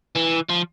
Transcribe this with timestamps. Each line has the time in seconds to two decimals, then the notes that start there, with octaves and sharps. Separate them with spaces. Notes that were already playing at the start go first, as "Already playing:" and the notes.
0.15 E3
0.49 F3